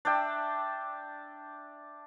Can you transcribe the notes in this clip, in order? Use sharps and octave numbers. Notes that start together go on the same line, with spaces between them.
D4 D5 E5 G5